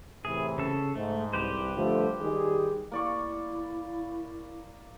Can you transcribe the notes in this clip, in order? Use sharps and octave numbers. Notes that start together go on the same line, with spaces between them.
A2 C3 E3 G#4
C#3 A4
G#2 A3
C2 G4 B4 C5
G2 D3 F3 A3
D#3 G3 G#4
A#3 E4 D5 C#6